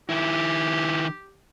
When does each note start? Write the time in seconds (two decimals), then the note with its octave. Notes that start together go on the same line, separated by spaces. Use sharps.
0.09 D#3 E4 G4